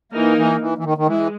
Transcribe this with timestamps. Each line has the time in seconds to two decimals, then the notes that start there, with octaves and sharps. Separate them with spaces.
0.13 E3 A#3 D#4 A#4
0.37 E3
0.61 E3
0.78 E3
0.84 D#3
0.98 D#3
1.07 E3 G#3